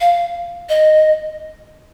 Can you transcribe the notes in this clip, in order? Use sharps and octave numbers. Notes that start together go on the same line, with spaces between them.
F5
D#5